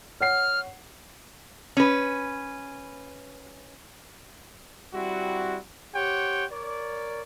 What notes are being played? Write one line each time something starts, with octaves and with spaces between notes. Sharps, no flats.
C#5 F#5 F6 C7
C#4 B4
G3 C4 E4 F#4
G4 C5 C#5 F#5 G5
A#4 C#5 D5